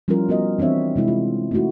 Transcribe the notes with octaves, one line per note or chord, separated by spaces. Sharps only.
F3 G3 C#4 E4 F4 A#4
B3 F#4 A#4 D#5
E3 C4 D4 C#5 E5
C3 G#3 E4
F4
A3 C#4 D#4 E4 F#4